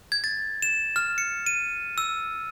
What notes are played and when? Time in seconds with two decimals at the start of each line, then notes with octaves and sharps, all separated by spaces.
0.12 G#6
0.24 A6
0.62 E7
0.96 F6
1.18 C#7
1.46 D#7
1.98 E6